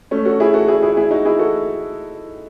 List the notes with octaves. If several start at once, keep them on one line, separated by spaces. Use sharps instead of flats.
A3 C#4
F#4 A4
E4 G#4
F#4 A4
E4 G#4
E4 G#4
E4 G#4
D#4 F#4
E4 G#4
F#4 A4